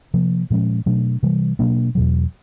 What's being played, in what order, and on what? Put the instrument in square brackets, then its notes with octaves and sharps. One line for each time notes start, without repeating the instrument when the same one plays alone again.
[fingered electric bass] C3 F3 A#3
A#2 F3 G#3 C#4
B2 F#3 A3 D4
C3 E3 G3
B2 F#3 A#3 D4
E2 B2 F#3